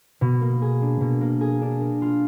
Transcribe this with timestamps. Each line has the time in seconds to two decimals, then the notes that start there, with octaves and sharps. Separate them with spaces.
0.21 B2
0.41 A#3
0.62 G#4
0.82 D4
1.01 B2
1.21 A#3
1.41 G#4
1.61 D4
1.81 A#3
2.02 F4